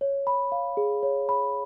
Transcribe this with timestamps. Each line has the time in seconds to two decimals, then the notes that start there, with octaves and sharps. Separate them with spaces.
0.01 C#5
0.27 B5
0.52 F5
0.77 G#4
1.03 C#5
1.29 B5